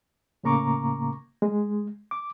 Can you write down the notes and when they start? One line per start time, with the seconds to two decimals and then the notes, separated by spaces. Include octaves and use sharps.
0.44 A2 C#3 A#3 A#5 C#6 D6
1.42 G#3
2.11 D6